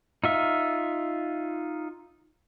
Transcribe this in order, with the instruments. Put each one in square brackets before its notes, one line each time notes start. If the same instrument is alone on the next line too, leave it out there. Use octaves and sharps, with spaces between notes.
[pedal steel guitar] D#4 F4 E5